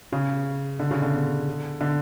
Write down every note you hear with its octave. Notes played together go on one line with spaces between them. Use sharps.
C#3
D3
C#3
D3
D3